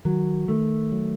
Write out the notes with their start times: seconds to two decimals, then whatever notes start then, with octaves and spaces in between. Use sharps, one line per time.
0.05 D#3 F#3
0.48 D#3 A3
0.92 F#3